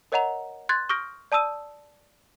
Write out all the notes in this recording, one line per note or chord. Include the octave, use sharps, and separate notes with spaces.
A#4 C#5 D#5 F#5 A#5 F7
C6 F#6 G#6 A6
C#6 D#6 F6 G6 A#6 D7
D5 A5 D#6 E6 D#7